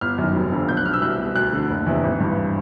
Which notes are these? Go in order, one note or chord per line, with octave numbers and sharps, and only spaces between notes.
G1 F6
F#2 D#3
F1
F2 D3
B1 G6
F#6
B2 F6
E6
C2 F#6
B2
D2 F#6
D3
F#1
E2 C3
G#1
G2 E3